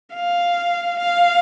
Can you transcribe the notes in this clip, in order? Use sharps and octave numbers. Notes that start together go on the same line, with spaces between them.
F5
F5